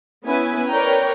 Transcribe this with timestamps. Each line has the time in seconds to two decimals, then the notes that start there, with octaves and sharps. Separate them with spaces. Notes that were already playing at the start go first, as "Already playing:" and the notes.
0.24 B3 C#4 E4 B4 G#5
0.69 A#4 B4 C#5 D5 G5 A#5